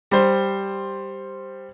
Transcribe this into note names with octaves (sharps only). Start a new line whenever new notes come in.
G3 C5